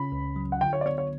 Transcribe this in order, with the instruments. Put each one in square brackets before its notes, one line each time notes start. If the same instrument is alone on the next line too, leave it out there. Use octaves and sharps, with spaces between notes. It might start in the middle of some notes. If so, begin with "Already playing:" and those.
Already playing: [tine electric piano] C#3 C#4 [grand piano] B5
[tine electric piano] C#2
F#3
[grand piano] F#5
[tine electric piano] D3 [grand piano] G5
[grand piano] C#5
D5
[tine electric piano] B3 [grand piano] C#5
[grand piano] C#5